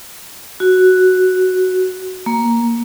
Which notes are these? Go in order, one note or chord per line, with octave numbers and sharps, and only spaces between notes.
F#4
A#3